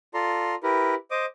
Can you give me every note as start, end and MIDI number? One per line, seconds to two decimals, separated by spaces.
0.14 0.55 65
0.14 0.55 69
0.14 0.55 74
0.14 0.55 82
0.14 0.55 84
0.63 0.95 64
0.63 0.95 67
0.63 0.95 70
0.63 0.95 71
1.11 1.25 72
1.11 1.25 75
1.11 1.25 86
1.11 1.25 87